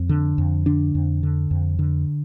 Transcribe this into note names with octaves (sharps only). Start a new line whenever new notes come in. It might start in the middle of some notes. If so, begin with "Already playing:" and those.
Already playing: F2 C4
D3
F2
D3 D4
F2
D3
F2
D3